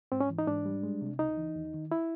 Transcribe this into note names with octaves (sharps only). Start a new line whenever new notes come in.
G#2 C4
C#4
E3
D#4
G#2 D4
G3
G#3
C3
C#2 D#4
E3
D#2
D#3
E4